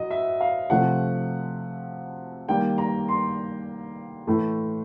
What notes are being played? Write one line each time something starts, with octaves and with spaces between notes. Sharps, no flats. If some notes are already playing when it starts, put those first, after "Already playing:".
Already playing: A2 F#3 D#5
E5
F5
C3 F3 A3 F#5
D#3 G3 A#3 G5
A#5
C6
A2 E3 A3